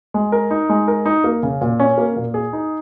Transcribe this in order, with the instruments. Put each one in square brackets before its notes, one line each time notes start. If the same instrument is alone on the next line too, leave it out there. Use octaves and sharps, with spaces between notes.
[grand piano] G#3
A#4
D#4
G#3
A#4
D#4
A#3
C#3
A#2
C#4
A#3
A#2
G#4
D#4